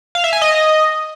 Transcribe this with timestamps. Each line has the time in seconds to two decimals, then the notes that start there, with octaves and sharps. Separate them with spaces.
0.15 F5
0.24 E5
0.33 G#5
0.42 D#5